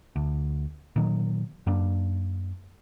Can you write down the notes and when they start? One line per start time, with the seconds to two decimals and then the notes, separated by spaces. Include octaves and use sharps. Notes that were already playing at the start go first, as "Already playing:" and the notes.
0.16 D2
0.96 A#2 D#3 F#3
1.66 F#2 A#3 D4